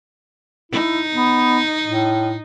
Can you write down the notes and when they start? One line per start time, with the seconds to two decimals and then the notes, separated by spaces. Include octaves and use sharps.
0.72 D#4 E4
1.13 B3
1.84 A2